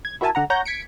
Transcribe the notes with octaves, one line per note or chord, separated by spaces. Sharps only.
G#6
E4 F#4 A#4 E5 G#5 A5
D3 F#5 A#5
C#5 F#5 A#5 G6 A#6
G#6 B6 C#7 D7